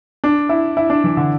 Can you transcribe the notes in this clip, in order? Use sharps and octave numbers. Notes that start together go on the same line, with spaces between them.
D4
E4
E4
D4
E3
D3